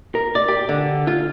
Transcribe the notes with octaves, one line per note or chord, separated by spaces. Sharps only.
A#4
D5
G4
D3
F4